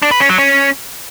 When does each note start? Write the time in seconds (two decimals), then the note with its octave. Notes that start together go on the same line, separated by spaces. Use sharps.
0.02 D4
0.11 B4
0.20 C#4
0.29 F#3
0.38 C#4